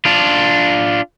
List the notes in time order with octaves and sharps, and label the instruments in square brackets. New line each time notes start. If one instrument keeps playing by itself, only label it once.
[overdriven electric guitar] D4 F4